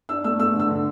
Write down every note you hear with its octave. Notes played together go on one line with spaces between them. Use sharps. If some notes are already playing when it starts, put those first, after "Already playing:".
D4 E6
A3 E6
A3 E6
D3 E6
D3